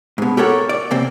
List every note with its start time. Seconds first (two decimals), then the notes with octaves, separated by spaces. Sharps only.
0.18 G#2 B2
0.37 G4 A4 A#4 C#5 F#5 G5
0.69 D5
0.91 C3 A#3 C4